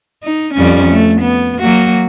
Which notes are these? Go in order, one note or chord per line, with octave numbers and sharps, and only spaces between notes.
D#4
F2 G3 C#4
A3
B3
F#3 A#3 F#4